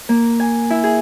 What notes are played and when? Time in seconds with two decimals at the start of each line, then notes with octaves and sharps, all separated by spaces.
0.09 A#3
0.40 G#5
0.70 E4
0.84 G#4